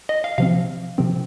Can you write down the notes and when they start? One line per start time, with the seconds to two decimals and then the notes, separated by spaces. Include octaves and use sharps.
0.09 D#5
0.24 F5
0.38 C3 F3 C4 F5
0.98 C3 F3 C4